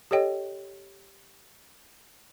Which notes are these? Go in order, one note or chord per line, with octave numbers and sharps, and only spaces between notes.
G4 A4 C#5 D#5 G5